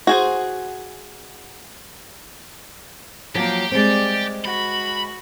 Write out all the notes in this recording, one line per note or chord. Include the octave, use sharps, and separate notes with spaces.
F#4 G#4 C5
F3 F#3 A#3 G4
G3 G#3 C4 D5
F#4 B5